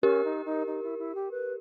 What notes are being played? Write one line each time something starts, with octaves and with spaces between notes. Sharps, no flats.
C#4 G4 A#4
D#4
D#4
D#4
E4
E4
G4
B4